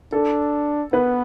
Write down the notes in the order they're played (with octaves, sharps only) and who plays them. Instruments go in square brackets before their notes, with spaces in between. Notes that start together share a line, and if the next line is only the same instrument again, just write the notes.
[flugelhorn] D4 [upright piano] A4
[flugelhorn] B3 [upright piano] B4